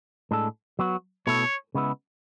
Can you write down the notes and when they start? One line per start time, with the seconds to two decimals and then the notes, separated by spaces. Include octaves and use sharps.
0.31 A2 G#3 D4 A4
0.79 F#3 B3 F#4
1.27 B2 A3 E4 A4 C#5
1.75 C#3 G#3 B3 E4